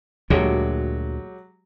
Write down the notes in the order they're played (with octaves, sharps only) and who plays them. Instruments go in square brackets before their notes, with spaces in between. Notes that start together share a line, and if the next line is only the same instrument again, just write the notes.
[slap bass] D2 A#2 [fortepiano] F#3 G#3 G4